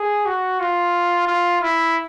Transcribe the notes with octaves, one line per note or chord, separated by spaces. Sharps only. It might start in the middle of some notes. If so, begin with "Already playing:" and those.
Already playing: G#4
F#4
F4
F4
E4